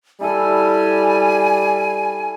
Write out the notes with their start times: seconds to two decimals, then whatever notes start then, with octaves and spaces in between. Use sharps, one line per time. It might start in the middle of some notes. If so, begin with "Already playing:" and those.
0.21 G3 E4 A4 G#5